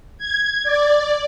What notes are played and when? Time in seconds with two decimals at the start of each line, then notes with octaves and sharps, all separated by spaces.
0.18 G#6
0.63 D5